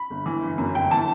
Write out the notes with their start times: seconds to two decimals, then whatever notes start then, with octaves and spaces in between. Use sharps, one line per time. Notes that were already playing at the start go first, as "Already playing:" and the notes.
Already playing: B5
0.10 G1
0.26 E3
0.42 G1
0.58 F#2
0.75 G1 G5
0.91 E3 A5